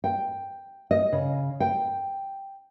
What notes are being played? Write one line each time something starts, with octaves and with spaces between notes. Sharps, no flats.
G5
D#5
C#3
G5